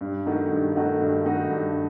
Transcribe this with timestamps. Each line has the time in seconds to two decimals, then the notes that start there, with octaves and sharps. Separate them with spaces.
0.01 G2
0.26 D#3 A3 D#4 F#4
0.51 G2
0.76 D#3 A3 D#4 F#4
1.00 G2
1.25 D#3 A3 D#4 F#4
1.49 G2